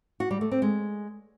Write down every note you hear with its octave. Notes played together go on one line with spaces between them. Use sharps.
F#4
G3
A3
C4
G#3